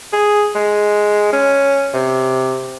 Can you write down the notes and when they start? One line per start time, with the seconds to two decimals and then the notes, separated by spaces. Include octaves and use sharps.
0.13 G#4
0.55 G#3
1.33 C#4
1.94 C3